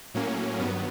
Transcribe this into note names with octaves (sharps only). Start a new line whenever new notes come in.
A2 F#3 A#3 C#4
G2 D#3 F#3 B3